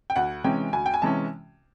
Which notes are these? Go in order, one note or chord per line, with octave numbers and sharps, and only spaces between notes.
G5
D2 F#5
C3 E3 G#3 C#4 G5
D2 G#5
G5
G#5
C3 E3 G#3 C#4 A5